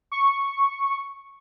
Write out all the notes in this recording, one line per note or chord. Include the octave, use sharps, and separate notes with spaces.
C#6